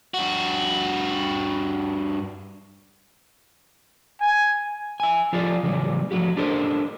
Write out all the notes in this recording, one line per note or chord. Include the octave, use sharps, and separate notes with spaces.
G2 F#4
G#5
E5 G#5
F3 F4 G4 A4 D5 D#5
C#3 E3 F#3 G3
F3 F#3 A3 F#4 G4
D4 G4 A4 A#4 C5 D#5